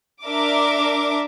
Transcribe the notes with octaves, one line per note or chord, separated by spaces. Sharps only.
D4 A#4 E5 D6